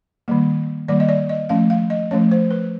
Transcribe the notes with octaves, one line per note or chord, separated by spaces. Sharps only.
D#3 G3 A#3
D#3 G3 A#3 D5
D#5
D5
D#5
F3 A3 C#4 F5
F5
D#5
F3 A3 C#4 C#5
C5
B4